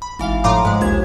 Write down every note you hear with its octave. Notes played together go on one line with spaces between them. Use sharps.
B5
G#1 E3 F5
A2 F3 F5 A#5 C6 D6
G#2 G#3
A#1 D#2 G#6